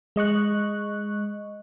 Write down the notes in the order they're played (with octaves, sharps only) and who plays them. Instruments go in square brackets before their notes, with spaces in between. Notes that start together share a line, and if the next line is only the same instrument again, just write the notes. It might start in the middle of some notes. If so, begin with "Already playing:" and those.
[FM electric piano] G#3 D#5 C#6 F#6